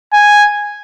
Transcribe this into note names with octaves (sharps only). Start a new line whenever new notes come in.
G#5